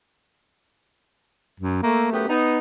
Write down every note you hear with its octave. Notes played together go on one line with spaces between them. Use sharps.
F#2
A3 A#3
F#2 A3 B3 G4
B3 D#4